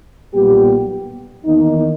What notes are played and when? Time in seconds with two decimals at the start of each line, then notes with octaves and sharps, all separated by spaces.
0.33 B1 A#2 G3 B3 G4
1.45 E2 D#3 A#3 D#4